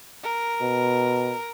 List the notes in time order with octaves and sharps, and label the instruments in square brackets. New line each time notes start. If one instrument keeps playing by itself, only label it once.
[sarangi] A#4
[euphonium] B2